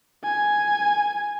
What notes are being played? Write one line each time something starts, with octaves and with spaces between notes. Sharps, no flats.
G#5